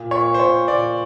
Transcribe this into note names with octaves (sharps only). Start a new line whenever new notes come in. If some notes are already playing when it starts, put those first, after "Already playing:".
Already playing: A#2
A#2 C#5
C5
A#2 C#5
A#2 D5